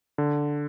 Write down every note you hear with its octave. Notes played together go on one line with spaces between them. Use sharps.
D3